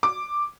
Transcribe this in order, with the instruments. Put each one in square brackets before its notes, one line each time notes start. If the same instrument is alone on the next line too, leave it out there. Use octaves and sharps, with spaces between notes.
[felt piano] D6